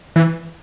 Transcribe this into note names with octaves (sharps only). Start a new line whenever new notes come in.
E3